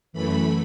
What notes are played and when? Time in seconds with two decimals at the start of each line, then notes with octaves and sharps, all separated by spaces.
0.13 F#2 E3 A3 B5